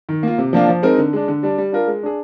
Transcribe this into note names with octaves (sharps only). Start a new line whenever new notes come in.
D#3
A#3 F4
C3
F3 A#3 D4 F4
F3
G#3 C4 D#4 A#4
D3
G#3 D4
D3
G3 D4
G3
D4 F4 A#4
G#3
D4 G#4